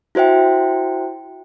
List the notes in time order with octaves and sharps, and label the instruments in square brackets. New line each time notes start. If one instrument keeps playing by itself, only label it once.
[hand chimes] E4 F#4 C5 E5 G5